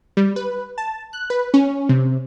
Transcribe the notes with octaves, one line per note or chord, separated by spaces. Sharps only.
G3
B4
A5
F#6
B4
C#4
C3